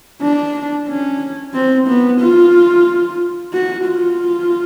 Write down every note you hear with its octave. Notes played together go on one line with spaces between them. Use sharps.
D4
C#4
C4
B3
F4
F#4
F4